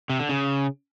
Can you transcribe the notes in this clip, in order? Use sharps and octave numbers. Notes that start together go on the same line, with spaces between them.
C3
D3
C#3